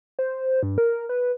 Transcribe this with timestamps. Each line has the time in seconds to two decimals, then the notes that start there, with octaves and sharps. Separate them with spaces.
0.19 C5
0.63 G2
0.78 A#4
1.09 B4